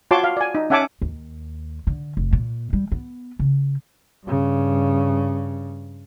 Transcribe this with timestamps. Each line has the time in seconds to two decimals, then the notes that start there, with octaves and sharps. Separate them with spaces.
0.11 F4 F#4 C#5 A5 C6 D6
0.24 F5
0.37 D5 G#5
0.55 D#4
0.70 C#4 E5 F#5 G#5 A5 D6
1.02 D#2
1.87 D3
2.17 F1
2.33 A#2
2.73 G3
2.92 B3
3.39 C#3
4.23 G2 C#3